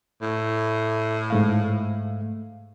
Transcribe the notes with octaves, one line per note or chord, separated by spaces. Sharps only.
A2
G#2 A3 F5